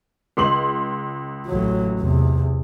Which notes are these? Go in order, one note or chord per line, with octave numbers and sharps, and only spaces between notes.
C#2 C6 F#7
A1 F#3
E2 C3